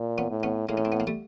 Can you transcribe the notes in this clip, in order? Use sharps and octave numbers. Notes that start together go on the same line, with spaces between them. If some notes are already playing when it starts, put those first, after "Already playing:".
Already playing: A#2
B3 C#4
A2
B3 C#4
A2 G#3 A#3
C#4
C4
B3
A#3
G3 A3